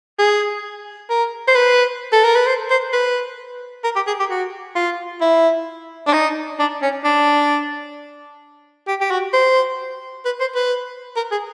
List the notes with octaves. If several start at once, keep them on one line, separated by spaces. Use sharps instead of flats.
G#4
A#4
C5
B4
A4
A#4
B4
C5
C5
B4
A#4
G4
G#4
G4
F#4
F4
E4
D4
D#4
D4
C#4
D4
G4
G4
F#4
C5
B4
C5
B4
A#4
G#4